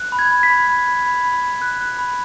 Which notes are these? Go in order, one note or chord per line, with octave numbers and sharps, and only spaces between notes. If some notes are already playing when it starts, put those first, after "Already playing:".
Already playing: F#6
B5
G#6
B5
B6
B5
B5
B5
B5
B5
B5
F#6
F#6
B5